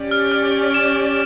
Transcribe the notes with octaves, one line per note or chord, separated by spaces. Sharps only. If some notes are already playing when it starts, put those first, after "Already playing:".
Already playing: C#4 G4 D5
F6
F6
E7